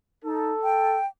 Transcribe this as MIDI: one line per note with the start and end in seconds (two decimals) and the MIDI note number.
0.24 0.52 63
0.24 0.98 69
0.63 1.06 79